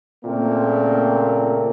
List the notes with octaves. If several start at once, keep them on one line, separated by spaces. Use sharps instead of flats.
A#2 C#3 A3 A#3 C4